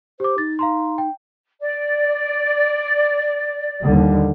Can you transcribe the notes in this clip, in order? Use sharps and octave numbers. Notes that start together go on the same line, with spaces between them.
G4 C5 D6
D#4 A6
F5 A#5 C6
G5
D5
D#2 D3 G3